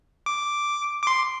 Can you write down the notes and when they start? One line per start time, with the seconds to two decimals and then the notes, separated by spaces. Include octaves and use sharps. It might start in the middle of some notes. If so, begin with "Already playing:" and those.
0.26 D6
1.02 D6
1.07 C6